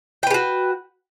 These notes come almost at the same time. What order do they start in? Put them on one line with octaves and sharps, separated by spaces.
G5 B4 G4 F#4